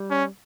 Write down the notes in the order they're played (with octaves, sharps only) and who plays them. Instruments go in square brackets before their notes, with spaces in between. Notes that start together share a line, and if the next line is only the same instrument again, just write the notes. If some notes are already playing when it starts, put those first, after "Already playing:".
Already playing: [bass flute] G3
[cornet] C#4